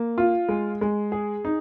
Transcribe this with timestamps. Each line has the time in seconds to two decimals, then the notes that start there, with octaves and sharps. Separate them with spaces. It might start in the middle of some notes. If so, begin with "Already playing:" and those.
Already playing: A#3
0.18 F4
0.49 G#3
0.81 G#3
1.12 G#4
1.45 D#4